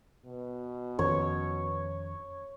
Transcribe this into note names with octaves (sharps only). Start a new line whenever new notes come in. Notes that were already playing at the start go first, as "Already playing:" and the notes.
B2
F2 D#3 C#4 C#5